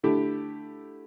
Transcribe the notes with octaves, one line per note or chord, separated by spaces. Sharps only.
D3 A3 E4 G4